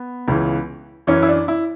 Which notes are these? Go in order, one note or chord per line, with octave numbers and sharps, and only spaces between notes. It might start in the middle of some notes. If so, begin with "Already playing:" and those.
Already playing: B3
C#2 C#3 E3
F#2 E3 C#4
E4
D4
E4